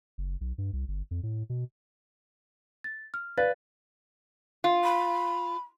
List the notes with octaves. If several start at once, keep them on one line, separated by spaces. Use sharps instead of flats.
F#1
B1
G2
C2
G1
F2
A2
B2
A6
F6
B4 D5 F5 A6
F4
B5